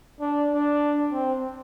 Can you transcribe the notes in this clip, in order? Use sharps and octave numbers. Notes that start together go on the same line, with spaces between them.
D4
D4
C4